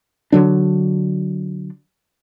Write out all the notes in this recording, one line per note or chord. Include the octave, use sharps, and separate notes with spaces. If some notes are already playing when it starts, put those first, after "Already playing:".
D3 F#3 D4